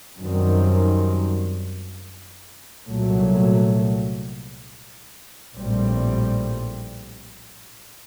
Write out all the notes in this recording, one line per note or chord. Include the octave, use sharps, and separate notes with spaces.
F#2 D#3 G3 C4
C2 A#2 F#3 A3
A#1 A2 G3 C4